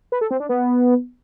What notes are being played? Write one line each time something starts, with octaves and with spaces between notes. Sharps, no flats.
B4
A4
C4
D4
B3